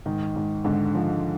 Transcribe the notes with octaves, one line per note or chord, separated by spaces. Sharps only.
G#2 D#3
G#2
G#2 D3
F3